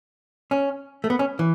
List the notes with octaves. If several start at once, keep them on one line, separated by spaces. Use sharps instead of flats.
C#4
A3
B3
C#4
E3